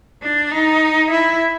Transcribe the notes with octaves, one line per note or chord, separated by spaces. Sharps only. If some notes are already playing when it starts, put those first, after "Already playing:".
D4
D#4
E4